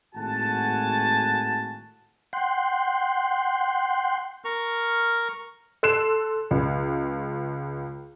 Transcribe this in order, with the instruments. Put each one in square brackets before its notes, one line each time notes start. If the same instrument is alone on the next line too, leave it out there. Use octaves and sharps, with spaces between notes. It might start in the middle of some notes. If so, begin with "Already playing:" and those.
[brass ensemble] G#1 A2 F#4 F#5 G#5 A5
[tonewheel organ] F#5 G5 C6
[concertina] A#4 C#6 F6
[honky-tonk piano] A4 C6 F#6 C7 E7
C#2